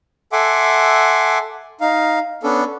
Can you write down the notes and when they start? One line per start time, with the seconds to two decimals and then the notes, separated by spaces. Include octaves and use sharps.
0.32 A4 E5 F#5 G#5 C6 D6
1.81 D#4 F5
2.43 B3 C#4 D4 A4